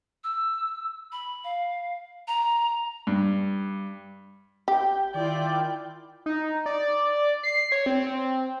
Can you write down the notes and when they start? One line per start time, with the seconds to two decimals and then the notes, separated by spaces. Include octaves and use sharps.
0.24 E6
1.12 B5
1.44 F5
2.28 A#5
3.07 G2
4.68 G4 G5
5.14 D#3 E4 F4 D5
6.26 D#4
6.66 D5
7.43 C7
7.72 C#5
7.86 C4
8.07 C4